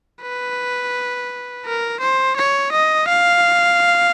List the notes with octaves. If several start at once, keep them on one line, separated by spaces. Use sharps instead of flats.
B4
A#4
C5
C#5
D#5
F5